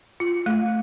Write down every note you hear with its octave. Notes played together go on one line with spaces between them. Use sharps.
F4
A3